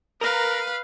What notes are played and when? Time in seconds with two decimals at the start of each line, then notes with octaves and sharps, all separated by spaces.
0.21 A#4 B4 F5